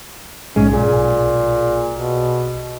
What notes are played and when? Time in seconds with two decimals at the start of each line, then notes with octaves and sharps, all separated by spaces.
0.56 A#1 G#2 G#3 C#4
0.70 B1 A#2 G#4
1.93 B2